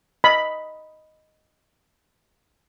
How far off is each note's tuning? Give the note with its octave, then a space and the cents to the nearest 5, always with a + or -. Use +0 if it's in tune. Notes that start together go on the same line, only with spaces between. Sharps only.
D#5 +0 B5 +0